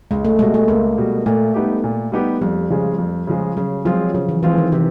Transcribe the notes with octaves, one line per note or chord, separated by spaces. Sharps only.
C#2 G#3
A3
B2 G3 G#3
A3
C#2 A#3
B2 G3
A#2 A3
G3 B3 D#4 G4
A#2
G3 B3 D#4 G4
F2 G3
C#3 F3 G#3
F2
C#3 F3 G#3
C#3 F#3
F3 F#3 G#3 C4 F4
C#3 F3
E3
E3 F3 G#3 C4 F4
D#3
C3 E3